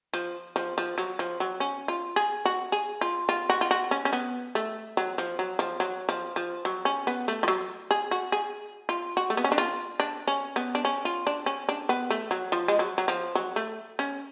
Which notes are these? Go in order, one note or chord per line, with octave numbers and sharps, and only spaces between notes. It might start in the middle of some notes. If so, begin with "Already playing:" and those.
F3
F3
F3
F#3
F3
F#3
C#4
F4
G#4
F#4
G#4
F4
F4
F#4
F4
F#4
C#4
C#4
B3
A3
F#3
F3
F#3
F3
F#3
F3
F3
F#3
C#4
B3
A3
F3
F#3
G#4
F#4
G#4
F4
F#4
A3
B3
C#4
D4
F4
D4
C#4
B3
D4
C#4
F4
D4
C#4
D4
B3
A3
F#3
F3
G#3
F#3
F#3
F3
F#3
A3
C#4